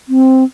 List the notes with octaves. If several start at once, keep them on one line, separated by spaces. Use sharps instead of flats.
C4